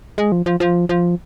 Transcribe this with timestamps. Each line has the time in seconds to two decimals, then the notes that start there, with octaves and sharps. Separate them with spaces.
0.18 G#3
0.32 F3
0.46 F3
0.60 F3
0.89 F3